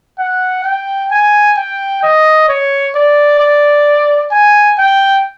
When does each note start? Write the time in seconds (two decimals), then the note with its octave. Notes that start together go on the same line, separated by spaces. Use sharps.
0.19 F#5
0.64 G5
1.11 G#5
1.57 G5
2.03 D#5
2.49 C#5
2.95 D5
3.40 D5
4.32 G#5
4.78 G5